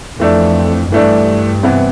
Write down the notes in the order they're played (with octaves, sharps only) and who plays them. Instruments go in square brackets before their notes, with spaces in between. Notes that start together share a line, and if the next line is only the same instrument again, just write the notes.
[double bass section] F2 [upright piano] E3 A3 D4
[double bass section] G2 [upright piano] E3 A3 D4
[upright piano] C3 E3 B3 E4